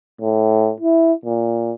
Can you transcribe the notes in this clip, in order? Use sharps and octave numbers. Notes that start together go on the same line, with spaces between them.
A2
E4
A#2